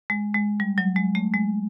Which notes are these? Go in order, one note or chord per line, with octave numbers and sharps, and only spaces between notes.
G#3
G#3
G3
F#3
G#3
A3
G#3